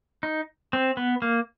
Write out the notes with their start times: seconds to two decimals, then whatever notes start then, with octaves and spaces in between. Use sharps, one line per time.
0.23 D#4
0.73 C4
0.97 B3
1.22 A#3